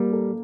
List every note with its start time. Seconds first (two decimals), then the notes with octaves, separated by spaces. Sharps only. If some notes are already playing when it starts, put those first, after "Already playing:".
Already playing: G3 A#3
0.13 A4